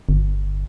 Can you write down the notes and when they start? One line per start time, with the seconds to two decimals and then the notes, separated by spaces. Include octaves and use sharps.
0.09 G1